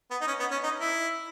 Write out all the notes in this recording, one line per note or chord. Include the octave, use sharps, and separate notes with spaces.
B3
D#4
C#4
B3
C#4
D#4
E4